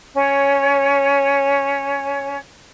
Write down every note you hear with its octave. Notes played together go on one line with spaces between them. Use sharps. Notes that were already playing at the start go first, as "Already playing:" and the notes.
C#4 C#5